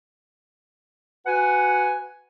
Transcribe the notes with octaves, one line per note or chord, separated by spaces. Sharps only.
F#4 B4 F#5 G#5